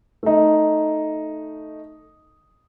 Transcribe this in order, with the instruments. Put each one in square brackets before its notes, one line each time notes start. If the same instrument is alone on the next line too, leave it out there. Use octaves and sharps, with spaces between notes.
[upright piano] A3 D#4